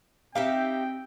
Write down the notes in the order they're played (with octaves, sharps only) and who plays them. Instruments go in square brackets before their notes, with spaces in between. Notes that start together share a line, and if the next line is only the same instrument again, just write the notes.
[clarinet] C4 [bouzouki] D#4 G4 E5 [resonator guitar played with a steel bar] F5 [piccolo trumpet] G5